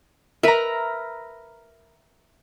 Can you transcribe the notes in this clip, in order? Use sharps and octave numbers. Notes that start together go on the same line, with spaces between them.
A#4 B4 E5 A#5